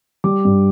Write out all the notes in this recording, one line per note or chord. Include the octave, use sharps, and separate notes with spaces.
G3 D6
G2